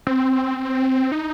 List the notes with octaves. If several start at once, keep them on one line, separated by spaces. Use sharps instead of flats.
C4
D#4